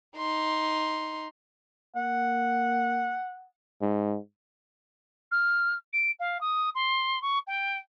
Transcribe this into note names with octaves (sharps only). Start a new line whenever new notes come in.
D#4 C6
A#3 F#5
G#2
F6
D7
F5
D#6
C6
C#6
G5